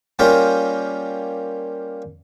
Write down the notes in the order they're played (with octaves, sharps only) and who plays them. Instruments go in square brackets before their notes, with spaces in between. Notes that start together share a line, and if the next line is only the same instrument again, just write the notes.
[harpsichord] G3 A#3 C#4 F4 G4 A#4